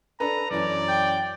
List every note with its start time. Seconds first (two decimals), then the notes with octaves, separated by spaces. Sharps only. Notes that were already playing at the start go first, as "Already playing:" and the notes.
0.20 D4 A4 B4 A#5
0.51 F#2 E3 C#4 D5
0.89 G5